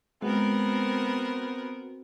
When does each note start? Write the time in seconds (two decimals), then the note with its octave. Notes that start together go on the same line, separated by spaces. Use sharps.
0.22 G#3 B3 C4 F#4 A#4